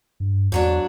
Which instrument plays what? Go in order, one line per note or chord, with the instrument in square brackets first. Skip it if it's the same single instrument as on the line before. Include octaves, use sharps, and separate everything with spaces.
[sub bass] G2
[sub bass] E2 [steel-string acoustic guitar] G#2 F#3 D4